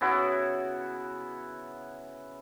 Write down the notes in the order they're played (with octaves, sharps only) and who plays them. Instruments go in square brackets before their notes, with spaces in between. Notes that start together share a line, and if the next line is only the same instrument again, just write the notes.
[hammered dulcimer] C#3 B3 E4 F#4